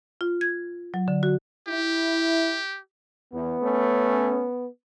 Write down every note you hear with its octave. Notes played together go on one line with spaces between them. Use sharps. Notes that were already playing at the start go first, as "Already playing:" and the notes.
F4
G#6
F#3
D3
F#4
E4 G4
E2 B3
A3 C#4